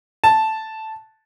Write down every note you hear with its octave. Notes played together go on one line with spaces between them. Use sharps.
A5